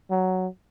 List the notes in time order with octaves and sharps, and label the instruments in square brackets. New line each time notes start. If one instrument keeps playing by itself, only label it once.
[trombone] F#3